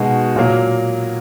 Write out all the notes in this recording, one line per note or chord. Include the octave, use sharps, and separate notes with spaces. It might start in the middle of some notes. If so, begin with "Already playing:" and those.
Already playing: B2 G#3 D#4 F#4
A#2 F#3 A#3